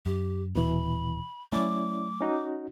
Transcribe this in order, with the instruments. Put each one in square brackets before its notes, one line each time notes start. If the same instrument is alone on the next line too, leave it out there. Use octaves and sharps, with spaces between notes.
[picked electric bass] F#2 [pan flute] G4
[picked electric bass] D#1 [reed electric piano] B2 E3 [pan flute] B5
[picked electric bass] F#3 A3 [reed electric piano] C#4 E4 D5 [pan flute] D6
[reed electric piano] C#4 D#4 F#4